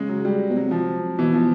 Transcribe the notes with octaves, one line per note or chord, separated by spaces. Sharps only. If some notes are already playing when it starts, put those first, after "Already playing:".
Already playing: C#3 G#3
F#3
G3
B2
C3 F#3
F3
B2 E3
F3